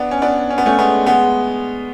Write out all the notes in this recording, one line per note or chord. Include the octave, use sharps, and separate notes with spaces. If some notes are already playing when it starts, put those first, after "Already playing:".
Already playing: B3 D4
C#4
B3 D4
C#4
B3
A3 C#4
G#3 B3
G#3 B3